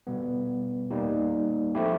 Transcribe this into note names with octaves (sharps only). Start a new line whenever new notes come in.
B2 G3 B3
G3 A#3 D#4 G4
F3 A3 C4 E4 G4